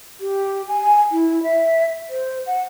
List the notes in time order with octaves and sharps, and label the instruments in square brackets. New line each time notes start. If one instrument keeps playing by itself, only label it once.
[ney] G4
G#5
E4
E5
C5
F#5